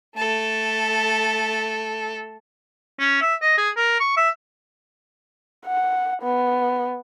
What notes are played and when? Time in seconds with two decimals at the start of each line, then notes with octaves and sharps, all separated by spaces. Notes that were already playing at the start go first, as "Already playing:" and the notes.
0.17 A3 A4
2.99 C#4
3.22 E5
3.42 D#5
3.58 G#4
3.77 A#4
4.00 C#6
4.17 E5
5.66 F#5
6.22 B3